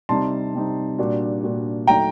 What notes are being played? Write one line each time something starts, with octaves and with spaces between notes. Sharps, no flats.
C3 G3 C4 D#4 A5 C6
C3 G3 C4 D#4
A#2 G3 D4 F#4
A#2 G3 D4 F#4
F#3 A3 D#4 F#4 G5 A#5